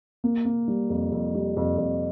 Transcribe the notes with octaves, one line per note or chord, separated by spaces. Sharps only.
A#3
A#3
G3
F2
F2
G3
F2
F2